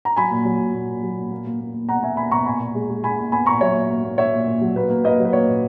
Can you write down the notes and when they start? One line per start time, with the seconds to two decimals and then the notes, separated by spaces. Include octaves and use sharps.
0.05 A#5
0.16 F#3 G#5 B5
0.31 A#2
0.45 F#3
0.60 A#2
0.74 A#2
0.89 A#2
1.03 F#3
1.18 A#2
1.31 A#3
1.46 A#3
1.60 A#3
1.74 A#3
1.89 B2 F#5 A#5
2.03 A#3 E5 G#5
2.17 A#3 G#5 B5
2.31 B2 A#5 C#6
2.46 A#2 G#5 B5
2.61 A#2
2.75 G#3
2.90 G#3
3.03 G#3 G#5 B5
3.19 A#2
3.32 B3 G#5 B5
3.46 A#2 A#5 C#6
3.61 F#3 C#5 E5
3.75 A#3
3.90 A#3
4.04 A#3
4.18 A#3 C#5 E5
4.33 A#2
4.48 A#2
4.61 F#3
4.76 A#3 B4
4.90 A#3
5.04 A#3 B4 D#5
5.19 F#3
5.25 B4
5.33 A#3 C#5
5.47 A#2